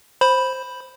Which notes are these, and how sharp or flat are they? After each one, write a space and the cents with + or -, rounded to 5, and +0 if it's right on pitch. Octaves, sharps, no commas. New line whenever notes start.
C5 +5 B5 +0